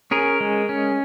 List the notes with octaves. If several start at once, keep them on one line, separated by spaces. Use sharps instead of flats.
C#4 G#4 A#4
G#3
C#4